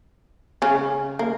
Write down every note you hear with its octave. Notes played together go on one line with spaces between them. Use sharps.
C#3 C#4
A#3